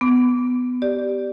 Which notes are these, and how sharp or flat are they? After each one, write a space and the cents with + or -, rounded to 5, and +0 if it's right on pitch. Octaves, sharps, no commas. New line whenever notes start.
B3 +15 D6 -20
G4 -5 D5 +0